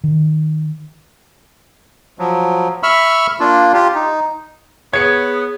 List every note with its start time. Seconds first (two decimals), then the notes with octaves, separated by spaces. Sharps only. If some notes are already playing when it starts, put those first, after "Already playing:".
0.04 D#3
2.19 F3 F#3
2.83 E5 B5 C#6 E6 F6
3.40 A#3 D4 F4
3.74 F4 G4
3.95 D#4
4.93 B3 G#4 C#5 G#6 C#7